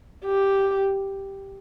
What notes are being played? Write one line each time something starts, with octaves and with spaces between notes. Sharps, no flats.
G4